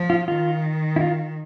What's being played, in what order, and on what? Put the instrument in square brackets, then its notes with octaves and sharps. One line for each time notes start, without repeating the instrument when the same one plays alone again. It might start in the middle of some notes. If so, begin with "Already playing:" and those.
Already playing: [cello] F3
[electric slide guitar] F4
[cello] D#3 [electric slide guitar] F4
[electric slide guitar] E4
F4